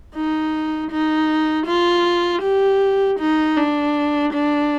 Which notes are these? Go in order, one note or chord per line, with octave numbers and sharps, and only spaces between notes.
D#4
D#4
F4
G4
D#4
D4
D4